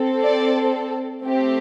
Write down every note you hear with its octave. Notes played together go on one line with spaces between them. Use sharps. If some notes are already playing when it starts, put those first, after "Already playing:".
Already playing: C4 A4
D5
A3 C4 G4